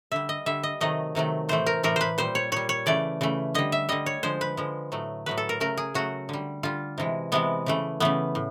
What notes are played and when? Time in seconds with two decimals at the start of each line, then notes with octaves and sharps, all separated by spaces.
0.12 D3 G3 E5
0.29 D#5
0.46 D3 G3 E5
0.63 D#5
0.81 C3 D#3 F#3 A3 D#5
1.15 C3 D#3 F#3 A3
1.49 A2 E3 A3 C5
1.66 A#4
1.83 A2 E3 A3 A#4
1.96 B4 C5
2.18 A#2 G3 C5
2.35 C#5
2.52 A#2 G3 C#5
2.69 C#5
2.86 C#3 E3 A3 D5
3.21 C#3 E3 A3
3.54 D3 G3 D#5
3.72 E5
3.89 D3 G3 D#5
4.06 C#5
4.23 D3 F3 G#3 C5
4.41 B4
4.57 D3 F3 G#3
4.92 A2 F#3 A3
5.26 A2 F#3 A3 B4
5.38 A4
5.49 A#4
5.60 C#3 F#3 A3 A#4
5.78 G#4
5.94 C#3 F#3 A3 F#4
6.29 D3 G3
6.63 D3 G3 F4
6.98 C3 E3 G#3
7.32 C3 E3 G#3 B3
7.66 C#3 E3 A3
8.00 C#3 E3 A3 B3
8.35 A2